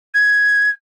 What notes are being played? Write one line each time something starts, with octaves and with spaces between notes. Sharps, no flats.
G#6